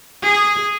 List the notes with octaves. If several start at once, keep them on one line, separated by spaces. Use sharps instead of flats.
G#4